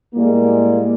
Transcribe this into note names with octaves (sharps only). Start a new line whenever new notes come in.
A2 G3 G#3 A#3